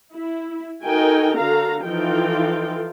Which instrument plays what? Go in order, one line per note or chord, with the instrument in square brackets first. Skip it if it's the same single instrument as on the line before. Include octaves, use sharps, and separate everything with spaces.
[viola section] E4
D#4 F#4 A4 A#4 G5 G#5
D3 F#4 A4 F5 A#5
E3 F3 D#4 F4 A4 G5